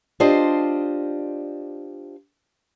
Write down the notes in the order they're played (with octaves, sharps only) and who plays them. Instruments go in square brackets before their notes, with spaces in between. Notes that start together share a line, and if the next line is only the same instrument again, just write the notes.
[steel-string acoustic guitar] D4 F4 G4 C5 D5 D#5